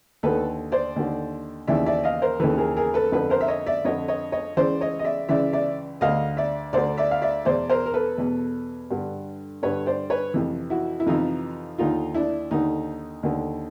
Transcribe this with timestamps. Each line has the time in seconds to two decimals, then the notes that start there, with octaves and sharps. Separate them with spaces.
0.23 D#2 D3 A4 B4
0.72 C5 D5
0.96 D#2 D3
1.67 D#2 C#3 E3 D5 E5
1.86 D5 E5
2.04 D#5 F5
2.22 A#4 C5
2.40 D#2 C#3 E3 A4 B4
2.58 G#4 A#4
2.77 G#4 A#4
2.94 A4 B4
3.12 F2 D3 A4 B4
3.30 A#4 C5
3.41 E5
3.48 C#5 D#5
3.66 D5 E5
3.85 F2 D3 C#5 D#5
4.08 C#5 D#5
4.32 C#5 D#5
4.57 C#2 C#3 E3 C5 D5
4.81 C#5 D#5
4.99 D#5
5.04 D5 E5
5.29 C#2 C#3 E3 D5 E5
5.53 D5 E5
6.01 D2 D3 D#5 F5
6.37 D5 E5
6.73 D2 D3 C5 D5
6.97 D5 E5
7.11 F5
7.22 D5 E5
7.45 E2 B2 C5 D5
7.70 A#4 C5
7.86 A#4
7.94 A4 B4
8.18 E2 B2
8.91 G2 D3
9.63 G2 D3 B4 C#5
9.86 C5 D5
10.10 B4 C#5
10.34 F2 C3 E3
10.70 E4 F#4
11.00 E4
11.06 F2 C3 E3 D#4 F4
11.78 D#2 D3 D#4 F4
12.14 D4 E4
12.51 D#2 D3 D#4
13.23 D#2 D3